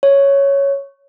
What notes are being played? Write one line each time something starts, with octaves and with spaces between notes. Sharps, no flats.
C#5